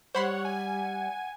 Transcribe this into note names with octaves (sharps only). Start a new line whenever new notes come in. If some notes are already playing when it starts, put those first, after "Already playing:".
G3 C5 C#5 F#5 B5 C6
F#5 G#5